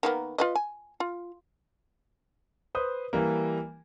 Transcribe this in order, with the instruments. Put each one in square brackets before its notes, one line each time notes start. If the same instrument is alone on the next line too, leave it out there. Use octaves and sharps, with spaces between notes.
[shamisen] D#3 A#3 B3
F4 B4 D#5
G#5
F4
[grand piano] B4 C5 D#6
E3 G3 A#3